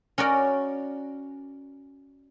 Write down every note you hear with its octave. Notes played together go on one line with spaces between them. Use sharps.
C#4 F#4 A#4 D5